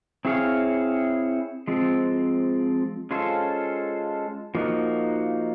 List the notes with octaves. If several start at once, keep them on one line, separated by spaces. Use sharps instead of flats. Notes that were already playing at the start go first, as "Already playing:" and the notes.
C4 E4 G#4 C#5 F5
F3 G#3 C4
G#3 C#4 F4 A4 C5
F3 A#3 D#4 F#4